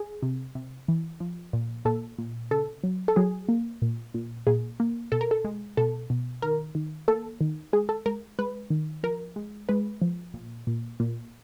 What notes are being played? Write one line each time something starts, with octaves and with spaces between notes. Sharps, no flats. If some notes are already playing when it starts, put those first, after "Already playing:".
Already playing: G#4
C3
C3
E3
F3
A#2
A#2 A4
A#2
C#3 A4
F#3
A4
F#3 G#4
A#3
A#2
A#2
A#2 G#4
A#3
B2 A4
A#4
A4
G#3
B2 A4
B2
D#3 A#4
D#3
A#3 A4
D#3
G#3 G#4
A4
G#3 A#4
G#3 B4
D#3
F3 A#4
G#3
G#3 B4
F3
A#2
A#2
A#2